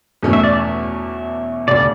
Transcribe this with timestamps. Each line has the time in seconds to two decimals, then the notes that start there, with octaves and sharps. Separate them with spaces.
0.23 E2 B2 A3 C#4
0.33 E5
0.44 D5
0.53 E5
1.68 E1 D2 C#3 D5